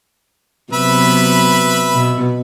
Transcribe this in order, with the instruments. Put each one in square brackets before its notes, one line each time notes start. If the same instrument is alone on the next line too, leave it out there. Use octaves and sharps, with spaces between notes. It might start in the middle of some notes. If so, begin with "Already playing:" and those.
[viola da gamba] C3 F#3 B3 [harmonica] B4 E5 B5
[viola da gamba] B2